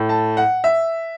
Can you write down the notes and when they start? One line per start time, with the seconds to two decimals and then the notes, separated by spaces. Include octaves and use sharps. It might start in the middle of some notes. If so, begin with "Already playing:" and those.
Already playing: A2 A3
0.09 A5
0.37 F#5
0.64 E5